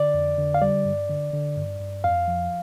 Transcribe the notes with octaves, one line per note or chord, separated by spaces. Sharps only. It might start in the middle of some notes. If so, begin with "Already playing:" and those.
Already playing: D3 D5
F2
D3
F5
G3 D5
G2
D3
D3
G2
G2
F2 F5
F3